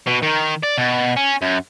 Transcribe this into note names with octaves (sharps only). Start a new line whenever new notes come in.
B2
D#3
D5
B2
C#4
F#2